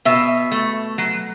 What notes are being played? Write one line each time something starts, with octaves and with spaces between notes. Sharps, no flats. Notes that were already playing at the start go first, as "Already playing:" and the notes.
B2 E5
A3
F#3